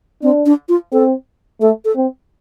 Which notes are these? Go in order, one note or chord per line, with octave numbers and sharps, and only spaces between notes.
C4 D4
D4
F4
C4 A4
A3 A4
A4
C4